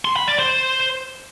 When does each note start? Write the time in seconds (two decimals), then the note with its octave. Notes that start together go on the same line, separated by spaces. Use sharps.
0.05 C6
0.16 B5
0.28 D5
0.39 C5